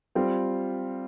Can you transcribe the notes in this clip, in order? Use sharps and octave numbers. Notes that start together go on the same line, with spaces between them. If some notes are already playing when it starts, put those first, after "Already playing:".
G3 C4 F4